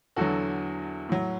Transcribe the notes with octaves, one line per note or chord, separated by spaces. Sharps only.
E2 D3 F#3 F#4 A4
A2 F#3